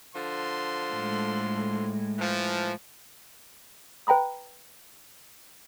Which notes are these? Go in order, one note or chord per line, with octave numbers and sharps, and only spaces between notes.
D3 F3 C6
A2 G#3
E3 F3
B4 G5 A#5 B5 D#6